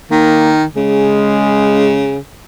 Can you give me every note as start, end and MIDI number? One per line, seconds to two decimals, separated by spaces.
0.11 0.65 51
0.11 0.53 58
0.76 2.18 49
0.76 2.13 56